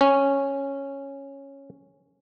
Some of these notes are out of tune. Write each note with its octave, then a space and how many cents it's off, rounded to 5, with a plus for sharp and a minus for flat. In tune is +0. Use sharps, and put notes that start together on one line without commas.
C#4 -5